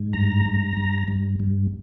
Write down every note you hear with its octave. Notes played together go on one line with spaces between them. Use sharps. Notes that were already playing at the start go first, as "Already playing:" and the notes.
Already playing: G#2
G2 A#5
G2
G2
G2
G2